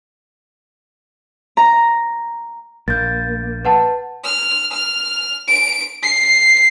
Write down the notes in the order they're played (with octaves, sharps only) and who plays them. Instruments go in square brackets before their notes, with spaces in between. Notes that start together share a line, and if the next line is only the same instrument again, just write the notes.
[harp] A#5
[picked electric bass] A#1 [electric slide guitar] A#3 [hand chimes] G6 A6
[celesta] B4 F#5 A5
[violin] F6
F6
D7
C7